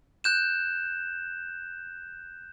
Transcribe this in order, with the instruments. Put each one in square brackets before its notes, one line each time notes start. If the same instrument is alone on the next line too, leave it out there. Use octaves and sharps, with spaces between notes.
[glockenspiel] F#6 G6 E7